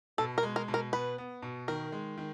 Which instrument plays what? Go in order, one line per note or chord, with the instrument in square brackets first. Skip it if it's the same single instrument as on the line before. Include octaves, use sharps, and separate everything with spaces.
[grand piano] B2 [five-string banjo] A4
[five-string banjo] A#4
[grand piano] G#3
[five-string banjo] A#4
[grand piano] B2
[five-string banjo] A#4
[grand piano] B3 [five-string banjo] B4
[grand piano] B3
B2
[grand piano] D#3 [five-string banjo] A#4
[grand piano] G#3
D#3